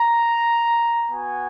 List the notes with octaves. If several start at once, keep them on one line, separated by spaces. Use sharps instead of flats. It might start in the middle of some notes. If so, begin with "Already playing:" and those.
Already playing: A#5
B3 F#4 G#5